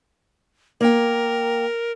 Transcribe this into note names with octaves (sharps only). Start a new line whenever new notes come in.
A#3 A#4 G5